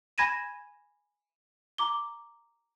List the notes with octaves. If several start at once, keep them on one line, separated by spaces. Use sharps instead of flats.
G#5 B5 G#6 A#6 D#7 E7
A#5 D6 G7